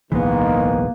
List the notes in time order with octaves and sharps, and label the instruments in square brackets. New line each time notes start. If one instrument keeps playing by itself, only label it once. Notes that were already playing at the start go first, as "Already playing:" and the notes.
[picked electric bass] D1 B1 [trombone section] G#2 D#3 [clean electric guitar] E3 G#3 B3 [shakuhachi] A#3